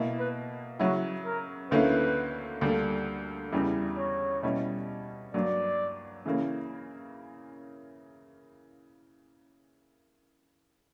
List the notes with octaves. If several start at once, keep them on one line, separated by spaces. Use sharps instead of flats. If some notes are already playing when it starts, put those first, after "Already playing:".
Already playing: B2 A#3 E4
B4
C#3 F#3 C#4 E4 F#4
A#4
D2 D3 A#3 C#4 E4 B4
D2 D3 G3 A#3 D4
E2 C#3 E3 G3
C#5
B2 G3 C#4 E4
G2 F#3 A#3 D5
C#3 E3 A#3 C#4